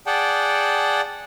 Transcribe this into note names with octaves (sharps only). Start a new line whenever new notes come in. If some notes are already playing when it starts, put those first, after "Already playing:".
G#4 D5 F#5 G5 A5